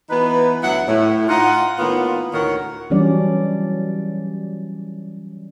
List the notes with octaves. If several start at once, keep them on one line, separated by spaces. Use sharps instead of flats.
E3 B3 D#4 B4
D2 F#3 B3 E4 F#5
A2
D#4 F4 F#5
A2 D#3 A#3 B3 F4
D2 A2 D#3 A#4 C#5 F#5
E3 F#3 G3 C#4 D4 D5